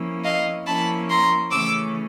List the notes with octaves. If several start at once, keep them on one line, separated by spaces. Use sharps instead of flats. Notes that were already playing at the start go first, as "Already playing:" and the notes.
Already playing: F3 A#3 C#4 E4
D#5 F5
F3 A#3 C#4 E4 A5 B5
A#5 C6
C#3 E3 A3 C#4 D6 E6